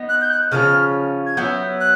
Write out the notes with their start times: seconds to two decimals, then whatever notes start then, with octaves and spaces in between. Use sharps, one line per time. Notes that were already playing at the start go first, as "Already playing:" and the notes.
Already playing: B3 D#4
0.09 F#6
0.21 G6
0.30 F#6
0.52 C#3 F3 A3 C#4 F6
1.26 G#6
1.37 F#3 B3 E4 G6
1.80 F#6